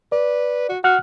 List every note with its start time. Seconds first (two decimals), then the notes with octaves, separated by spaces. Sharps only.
0.12 B4 D5
0.69 F#4
0.84 F#4 F#5 F6 F#6